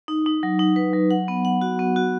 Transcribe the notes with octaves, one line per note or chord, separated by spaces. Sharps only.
D#4
D#4
F#3
D#4
B4
F#3
F#5
B3
F#5
F#4
B3
F#4